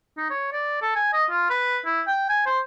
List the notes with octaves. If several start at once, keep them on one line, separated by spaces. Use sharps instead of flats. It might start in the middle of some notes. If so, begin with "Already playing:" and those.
D#4
C#5
D5
A4
G#5
D#5
F4
B4
E4
G5
G#5
C5